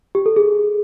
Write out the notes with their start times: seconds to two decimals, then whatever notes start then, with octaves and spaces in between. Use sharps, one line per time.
0.15 G4
0.26 A4
0.36 G#4